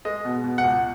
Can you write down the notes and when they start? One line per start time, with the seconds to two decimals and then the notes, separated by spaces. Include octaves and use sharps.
0.05 G#3 D#5
0.25 B2
0.44 B2
0.58 F#5
0.64 C#2